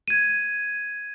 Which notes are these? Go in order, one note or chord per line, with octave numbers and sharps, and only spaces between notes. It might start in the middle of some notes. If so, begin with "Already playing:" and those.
G#6 D#7